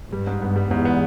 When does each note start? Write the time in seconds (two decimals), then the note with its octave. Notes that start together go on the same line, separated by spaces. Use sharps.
0.12 G2 G3
0.27 G#2
0.42 G2 B3
0.56 G3
0.70 E2 G#2
0.85 B3